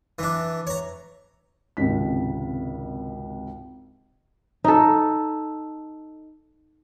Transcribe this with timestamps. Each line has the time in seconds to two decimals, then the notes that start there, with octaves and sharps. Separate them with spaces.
0.19 E3 D4
0.67 C#5 A#5
1.77 G#1 C#2 C3 B6
4.64 D#4 A4